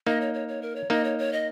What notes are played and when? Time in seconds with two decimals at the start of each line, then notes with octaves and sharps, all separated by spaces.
0.07 A#3 D#4 D#5
0.21 C#5
0.34 C#5
0.48 C#5
0.62 A#4
0.76 C#5
0.90 A#3 D#4 D#5
1.04 C#5
1.19 C#5
1.33 D#5